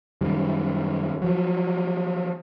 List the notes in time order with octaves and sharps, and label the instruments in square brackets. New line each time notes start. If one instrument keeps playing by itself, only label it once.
[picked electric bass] F#2 D#3 G3
F3 F#3